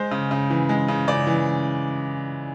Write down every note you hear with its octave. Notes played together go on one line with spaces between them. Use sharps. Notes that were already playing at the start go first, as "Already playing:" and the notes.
Already playing: G#3 C5
C#3
C#3
E3
G#3
C#3
C#3 D5
E3